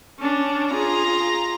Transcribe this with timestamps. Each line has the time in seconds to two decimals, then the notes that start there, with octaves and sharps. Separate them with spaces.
0.19 C#4 D4
0.74 F4 G#4 A#5